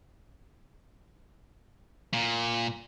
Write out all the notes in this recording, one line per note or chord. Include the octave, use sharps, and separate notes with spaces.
A#2